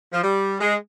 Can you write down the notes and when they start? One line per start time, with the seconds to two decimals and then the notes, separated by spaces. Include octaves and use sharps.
0.13 F3
0.23 G3
0.61 G#3